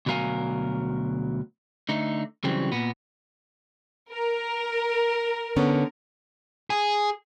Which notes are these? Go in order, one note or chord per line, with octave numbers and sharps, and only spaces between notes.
D2 B2 F#3 A#4 F5 G#5
D3 A3 D#4
C#3 E3 F#3 G3 C4
A#2 B3
A#4
D3 B3 C#4
G#4